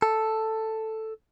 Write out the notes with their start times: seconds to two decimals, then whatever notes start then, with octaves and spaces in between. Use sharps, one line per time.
0.02 A4